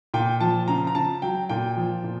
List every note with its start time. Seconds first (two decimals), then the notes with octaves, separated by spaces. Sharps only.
0.14 A#2 G5
0.41 F3 A5
0.68 C#3 A#5
0.87 A#5
0.95 C#3 A5
1.22 F#3 G5
1.49 A#2 G5
1.77 F3
2.03 A#2